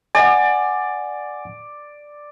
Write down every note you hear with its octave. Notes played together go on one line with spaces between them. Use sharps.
D5 F#5 G#5